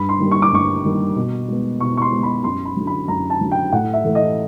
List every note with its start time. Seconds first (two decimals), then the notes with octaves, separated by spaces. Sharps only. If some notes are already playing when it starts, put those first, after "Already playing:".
Already playing: G2 B5
0.09 C6
0.20 D#3 G3 A#3
0.31 C#6
0.42 D6
0.52 G2 C#6
0.84 D#3 G3 A#3
1.16 B2
1.48 G#3 B3
1.80 B2 C#6
1.97 C#6
2.02 C6
2.12 G#3 B3
2.23 B5
2.44 F#2 C6
2.66 B5
2.77 D3 F#3
2.87 B5
3.08 F#2 A#5
3.30 A5
3.41 D3 F#3
3.51 G5
3.73 A2 F#5
3.93 E5
4.04 E3 A3
4.15 D#5